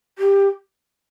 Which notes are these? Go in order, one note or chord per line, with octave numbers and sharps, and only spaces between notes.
G4